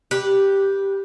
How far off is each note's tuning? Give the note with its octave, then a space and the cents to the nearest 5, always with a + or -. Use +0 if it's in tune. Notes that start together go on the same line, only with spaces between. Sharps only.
G4 +0 B4 -15